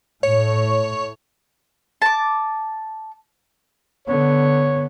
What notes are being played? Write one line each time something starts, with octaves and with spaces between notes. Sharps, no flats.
A2 C#5
A5 D6
D3 B3 C#5